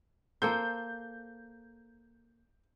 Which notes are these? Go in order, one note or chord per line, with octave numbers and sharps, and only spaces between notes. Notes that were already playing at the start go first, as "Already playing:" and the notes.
A#3 A4 C5 G6